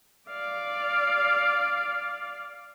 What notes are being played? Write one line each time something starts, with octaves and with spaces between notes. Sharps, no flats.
D5 F5